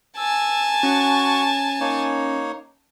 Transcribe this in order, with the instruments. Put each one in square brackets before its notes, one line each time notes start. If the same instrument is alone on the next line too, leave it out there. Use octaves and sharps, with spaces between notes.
[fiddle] G#5 A5 [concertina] E6
[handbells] C#4 [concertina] F#4 C#6
[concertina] A#3 D#4 C#5